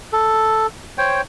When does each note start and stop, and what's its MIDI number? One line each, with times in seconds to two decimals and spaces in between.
0.13 0.67 69
0.98 1.21 72
0.98 1.21 73
0.98 1.21 79